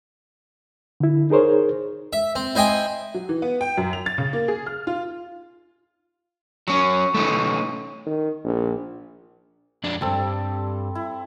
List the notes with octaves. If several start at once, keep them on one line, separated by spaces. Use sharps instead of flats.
D3 E4
D#4 G#4 A#4 C5 C#5
E5
C4
E4 C5 D#5 G5 G#5
F#3
E3
B3
G5
F#2
F7
A6
C#3
A#3
G#4
F6
F4
F#3 C#4 C#6
A3 C#4 D#4
D#3
A#1
F2 D4
C#2 G2 G3 C4 A4
E4